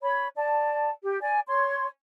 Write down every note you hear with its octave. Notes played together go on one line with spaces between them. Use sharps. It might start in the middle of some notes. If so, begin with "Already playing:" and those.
C#5 B5
D5 A5
G4
D5 G#5
C#5 C6